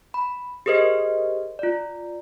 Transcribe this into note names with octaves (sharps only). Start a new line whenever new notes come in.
B5
G4 G#4 A#4 C5 D#5
F4 D5